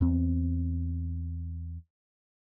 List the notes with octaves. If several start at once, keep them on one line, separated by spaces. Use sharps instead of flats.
E2 C4